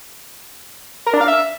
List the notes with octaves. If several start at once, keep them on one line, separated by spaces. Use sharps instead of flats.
A#4
D4
F5
E5